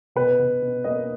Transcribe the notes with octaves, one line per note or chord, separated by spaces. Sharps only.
B2 B4
B2
B2
A#3 D#5